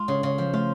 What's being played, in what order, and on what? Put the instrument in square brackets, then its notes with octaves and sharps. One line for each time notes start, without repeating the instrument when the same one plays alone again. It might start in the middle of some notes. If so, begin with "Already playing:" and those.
Already playing: [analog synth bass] G#3 [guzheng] F4
[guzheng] C#3
C#3
F3
[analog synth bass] A3 [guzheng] F4